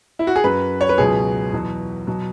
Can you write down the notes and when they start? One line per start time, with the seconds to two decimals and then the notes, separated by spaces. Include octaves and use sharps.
0.19 E4
0.27 F#4
0.36 G#4
0.44 F#2 F#3 B4
0.81 C#5
0.89 B4
0.98 C#2 B2 F#3 G#4
1.53 E2 B2 F#3
2.07 B2 F#3